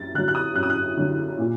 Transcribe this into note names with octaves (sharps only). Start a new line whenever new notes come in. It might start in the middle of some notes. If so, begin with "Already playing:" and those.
Already playing: F#2 A6
D3 F#3 F#6
F#6
D#6
F#2 F#6
D#6
F#6
D3 F#3
A#2